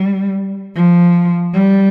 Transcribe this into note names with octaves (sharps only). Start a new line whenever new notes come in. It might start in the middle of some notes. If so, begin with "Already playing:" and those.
Already playing: G3
F3
G3